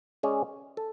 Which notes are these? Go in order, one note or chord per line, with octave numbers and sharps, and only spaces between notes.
G#3 C#4 G#4 D5
A4